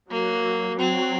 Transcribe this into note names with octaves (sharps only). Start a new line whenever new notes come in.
F#3 A#3
F#3 C4